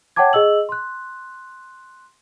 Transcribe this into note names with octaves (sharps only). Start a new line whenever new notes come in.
C#5 F#5 G5 A5 D6 G#6
G#4 D#5 E6 F#7
C6 F#6